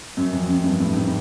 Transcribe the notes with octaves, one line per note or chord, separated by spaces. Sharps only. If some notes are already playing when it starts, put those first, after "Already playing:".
F#2
F2
F#2
G2
A2
G#2